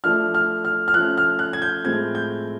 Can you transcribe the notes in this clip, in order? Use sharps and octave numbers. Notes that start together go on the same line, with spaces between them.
F3 A3 D4 F6
F6
F6
F6
F3 A3 C#4 F#6
F6
F#6
G#6
G6
A2 F3 G#3 C4 G#6
G6